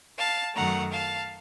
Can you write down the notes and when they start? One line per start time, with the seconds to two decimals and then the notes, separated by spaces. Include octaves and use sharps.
0.18 F5 A5
0.55 F#2 D#3 F#3 A3 F#5 A#5
0.92 F5 A5